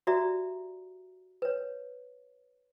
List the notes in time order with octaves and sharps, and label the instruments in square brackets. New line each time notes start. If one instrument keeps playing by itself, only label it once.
[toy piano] F#4 G4 D5 E5 A#5
B4 C#5